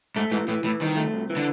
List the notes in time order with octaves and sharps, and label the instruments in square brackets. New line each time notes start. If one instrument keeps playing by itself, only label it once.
[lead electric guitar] G#2 [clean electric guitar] A3
[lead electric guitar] G#2 [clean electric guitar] E3
[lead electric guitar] A2 [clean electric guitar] E3
[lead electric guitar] A2 [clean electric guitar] E3
[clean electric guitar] C2 [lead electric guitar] D#3
[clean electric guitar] A3
C2
E3
[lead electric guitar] D3